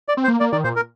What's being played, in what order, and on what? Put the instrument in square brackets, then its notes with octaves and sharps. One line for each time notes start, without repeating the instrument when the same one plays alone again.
[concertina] D5
[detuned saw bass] C4
[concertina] C5
[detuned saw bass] A#3
[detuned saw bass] A#3 [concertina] D5
[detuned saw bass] D#3 [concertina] D5
[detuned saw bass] A#2 [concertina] C5
[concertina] A#4